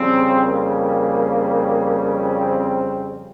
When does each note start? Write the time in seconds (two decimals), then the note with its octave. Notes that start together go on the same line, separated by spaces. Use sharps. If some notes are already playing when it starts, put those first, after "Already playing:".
Already playing: F2 C#3 G3 C4
0.42 A#3
2.22 C4